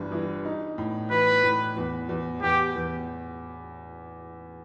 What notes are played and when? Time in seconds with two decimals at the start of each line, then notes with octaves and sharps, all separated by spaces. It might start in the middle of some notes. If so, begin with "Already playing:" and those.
Already playing: G1 G2 E3
0.12 E3
0.45 D#4
0.78 A2
1.11 E3 B4
1.43 A2
1.76 E2
2.09 E2
2.42 E2 G4
2.75 E2